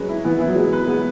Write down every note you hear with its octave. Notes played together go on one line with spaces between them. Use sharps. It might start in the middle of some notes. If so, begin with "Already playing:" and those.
Already playing: F#3 G#3 C#4 B4
E4
E3 B3
E3 E4
F#3
G#3 B3
B4
G#3 B3